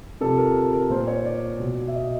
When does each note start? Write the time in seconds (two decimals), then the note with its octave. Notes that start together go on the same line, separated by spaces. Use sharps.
0.21 C3 F3 A4
0.38 A#4
0.56 A#4
0.73 A#4
0.90 A#2 F3 C5
1.07 C#5
1.25 D5
1.60 B2
1.88 E5
1.95 D#5